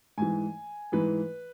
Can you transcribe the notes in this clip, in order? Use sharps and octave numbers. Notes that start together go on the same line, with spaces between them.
G#2 E3 G#5
G#2 E3 B4